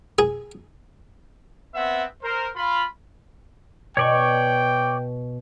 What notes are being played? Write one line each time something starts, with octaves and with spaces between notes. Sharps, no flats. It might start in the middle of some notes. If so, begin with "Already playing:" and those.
G#4
B3 C4 E5 F#5
A#4 C5
F4 B5
B2 C#5 D5 G5 C#6